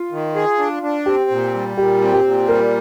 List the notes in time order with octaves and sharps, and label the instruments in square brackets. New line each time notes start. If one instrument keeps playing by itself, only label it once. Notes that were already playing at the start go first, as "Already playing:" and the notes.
Already playing: [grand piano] F4
[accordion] D#3
G#4
D4
D4
[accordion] C4 [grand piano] G4
[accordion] A#2
G3
[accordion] A#2 [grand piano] G4
[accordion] C4
[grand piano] G4
[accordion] A#2
[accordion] G3 [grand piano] A#4